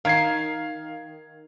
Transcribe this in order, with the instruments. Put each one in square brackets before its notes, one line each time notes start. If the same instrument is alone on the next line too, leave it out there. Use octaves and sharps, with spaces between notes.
[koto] D#3 [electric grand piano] F5 G#6 C7